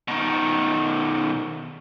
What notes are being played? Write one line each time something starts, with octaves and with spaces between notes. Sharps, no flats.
B2 D#3